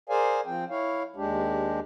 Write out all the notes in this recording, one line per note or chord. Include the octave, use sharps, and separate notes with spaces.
G#4 A#4 C5 D5 F5 G#5
F3 C4 G5
E4 C#5 F5
D#2 G#3 D4 G4